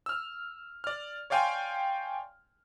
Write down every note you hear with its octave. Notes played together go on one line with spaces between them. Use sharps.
E6 F6
D5 F6
C#5 D5 F5 G5 G#5 C6